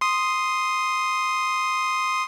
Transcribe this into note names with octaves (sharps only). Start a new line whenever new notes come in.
C6 D#6